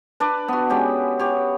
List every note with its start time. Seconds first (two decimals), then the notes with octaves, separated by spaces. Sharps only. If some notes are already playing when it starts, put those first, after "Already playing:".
0.20 D4 B4 D5
0.48 B3 F#4
0.70 G#3 C#4 G4
1.19 G4 C#5